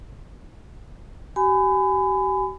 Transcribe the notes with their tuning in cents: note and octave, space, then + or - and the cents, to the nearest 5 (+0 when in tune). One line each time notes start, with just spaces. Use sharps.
G4 -40 G#5 +0 B5 +30